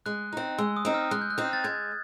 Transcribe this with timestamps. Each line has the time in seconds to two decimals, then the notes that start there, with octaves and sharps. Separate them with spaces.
0.06 G#3 F#6
0.33 C4 D#4
0.58 G#3 E6
0.76 D#6
0.85 C4 D#4
0.94 F6
1.11 G#3 F#6
1.21 G6
1.30 F#6
1.38 C4 D#4
1.53 A6
1.64 G#3 G#6